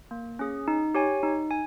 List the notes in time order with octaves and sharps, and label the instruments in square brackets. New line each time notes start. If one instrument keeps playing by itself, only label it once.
[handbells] A#3
C#4 G#4
D#4
G4 C#5 G#5
D#4
G#5